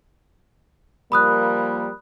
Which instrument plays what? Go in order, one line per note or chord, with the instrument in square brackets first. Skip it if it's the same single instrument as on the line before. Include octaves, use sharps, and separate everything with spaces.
[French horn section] F3 G3 A#3 [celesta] B5 D#6 F#6